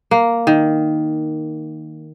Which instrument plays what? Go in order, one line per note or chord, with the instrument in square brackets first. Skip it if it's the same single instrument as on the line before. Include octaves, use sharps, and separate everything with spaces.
[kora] A#3
D#3